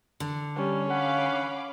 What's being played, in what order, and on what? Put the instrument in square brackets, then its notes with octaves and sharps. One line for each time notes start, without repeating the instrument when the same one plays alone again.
[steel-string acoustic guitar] D3
[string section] G3 [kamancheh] C#4
[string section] F5 B5 D6 [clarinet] F#5